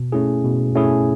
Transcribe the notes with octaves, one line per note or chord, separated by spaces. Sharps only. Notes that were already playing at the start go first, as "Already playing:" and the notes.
Already playing: B2
A3 C#4 E4 G#4
B2
A3 C#4 E4 G#4